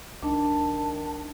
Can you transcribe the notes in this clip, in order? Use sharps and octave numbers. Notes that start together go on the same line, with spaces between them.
C#2 D#3 D4 A5